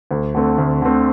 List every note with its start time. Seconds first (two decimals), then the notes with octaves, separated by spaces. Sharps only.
0.11 D2
0.35 D3 A3 C4
0.58 D2
0.82 D3 A3 C4